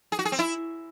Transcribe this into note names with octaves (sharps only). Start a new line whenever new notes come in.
G#4
F#4
G#4
C4
E4